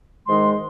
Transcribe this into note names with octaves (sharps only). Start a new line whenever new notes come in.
G#2 D#3 G#3 D#4 C6